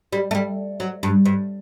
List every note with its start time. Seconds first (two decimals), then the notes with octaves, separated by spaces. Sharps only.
0.13 G3
0.31 A3
0.35 G3
0.80 F#3
1.03 G2
1.25 G2